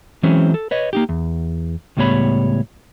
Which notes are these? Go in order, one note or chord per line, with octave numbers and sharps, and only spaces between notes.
E3 F#3 G#3 C4 C#4
A4
B4 C#5 D#5
A#3 D#4 G4
E2
C#2 A2 G3 B3 C#5 B5